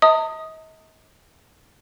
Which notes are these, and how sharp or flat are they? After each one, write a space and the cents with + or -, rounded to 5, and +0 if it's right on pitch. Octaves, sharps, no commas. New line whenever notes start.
D#5 +40 A#5 -45 D#6 +0